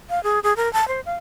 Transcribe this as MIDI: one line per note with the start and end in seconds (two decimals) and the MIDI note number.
0.10 0.22 77
0.23 0.39 68
0.43 0.53 68
0.57 0.71 70
0.73 0.87 81
0.88 1.00 72
1.06 1.14 77